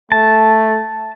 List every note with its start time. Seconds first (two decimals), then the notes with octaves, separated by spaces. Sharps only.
0.12 A3 A5